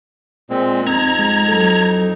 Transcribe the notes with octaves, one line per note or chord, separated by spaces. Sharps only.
A#2 G#3 C4
F2 C4 D#4 A#5 G#6
G#3
F#3 A4